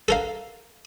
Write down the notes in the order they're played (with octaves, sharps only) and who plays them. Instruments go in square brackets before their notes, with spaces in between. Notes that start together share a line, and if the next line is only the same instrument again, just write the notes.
[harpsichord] A4 A#4 F5